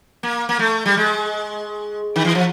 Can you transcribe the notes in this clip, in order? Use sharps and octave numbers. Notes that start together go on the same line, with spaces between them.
A#3
A#3
A3
G3
G#3
D#3
E3
F3